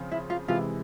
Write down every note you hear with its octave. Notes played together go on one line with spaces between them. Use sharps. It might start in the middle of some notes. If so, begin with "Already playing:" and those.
Already playing: C#3 F3 C4 F4
E4
F4
C3 E3 G#3 E4 F4